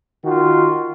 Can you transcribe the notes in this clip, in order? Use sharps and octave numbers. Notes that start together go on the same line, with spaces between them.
D#3 F4 F#4